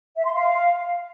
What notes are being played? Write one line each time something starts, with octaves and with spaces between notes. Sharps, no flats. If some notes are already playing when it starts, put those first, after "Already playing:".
E5
C6
F5